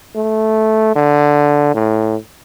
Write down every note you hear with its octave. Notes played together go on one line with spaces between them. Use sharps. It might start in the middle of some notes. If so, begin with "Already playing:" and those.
A3
D3
A2